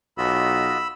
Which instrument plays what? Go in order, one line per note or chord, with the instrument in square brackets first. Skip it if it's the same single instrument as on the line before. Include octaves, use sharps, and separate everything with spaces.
[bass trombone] B1 [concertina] F4 F#4 D#5 [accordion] B5 E6